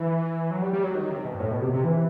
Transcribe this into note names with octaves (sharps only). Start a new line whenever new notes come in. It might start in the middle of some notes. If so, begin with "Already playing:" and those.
Already playing: E3
F#3
G3
G3
F#3
D#3
C3
B2
G2
A2
B2
C3
C3
E3